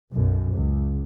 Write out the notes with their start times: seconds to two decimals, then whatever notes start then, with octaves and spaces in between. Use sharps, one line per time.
0.12 B1 F#2
0.52 C#2